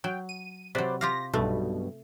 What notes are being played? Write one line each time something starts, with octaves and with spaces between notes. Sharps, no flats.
F#3 G5
D#7
C3 F#3 B4 C5 D5
F4 G4 F5 A#6
B1 G2 B2 A3